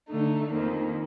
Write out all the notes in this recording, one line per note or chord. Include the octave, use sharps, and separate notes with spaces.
D3 A3 D#4
F2 D#3 A#3